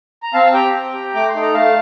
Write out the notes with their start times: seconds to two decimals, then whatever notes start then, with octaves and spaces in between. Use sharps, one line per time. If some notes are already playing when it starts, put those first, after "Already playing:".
0.23 A#5
0.34 C4 F5 A5
0.46 A5
0.53 G4 G5 A#5
0.74 C4
0.94 G4
1.14 A3 D6
1.29 C6
1.35 D#4 A4
1.41 A#5
1.54 A3 F5 A5